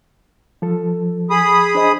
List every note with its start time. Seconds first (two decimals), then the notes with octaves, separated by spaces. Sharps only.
0.62 F3 A4
1.30 G#4 B5 D#6
1.75 D4 C5 D#5